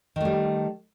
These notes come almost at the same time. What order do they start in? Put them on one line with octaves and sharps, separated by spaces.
D#3 A3 G3